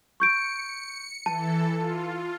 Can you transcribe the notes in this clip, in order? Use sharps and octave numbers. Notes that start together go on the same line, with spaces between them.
C#6 G6 C#7 D7
E3 A4 A5
F4